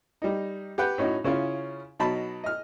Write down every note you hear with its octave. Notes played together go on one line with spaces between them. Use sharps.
G3 D#4
G4 B4 F#5 G5
A2 C#4 D#4 F#4
C#3 C#4 E4 F4
B2 F#3 D#4 A5 B5
D#5 F6